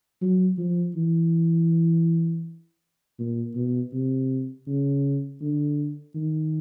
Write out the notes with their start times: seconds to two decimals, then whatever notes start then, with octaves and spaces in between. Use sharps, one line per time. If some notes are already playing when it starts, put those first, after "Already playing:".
0.22 F#3
0.58 F3
0.96 E3
3.19 A#2
3.56 B2
3.93 C3
4.67 C#3
5.41 D3
6.15 D#3